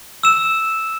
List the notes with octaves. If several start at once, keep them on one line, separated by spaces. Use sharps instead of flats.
E6 E7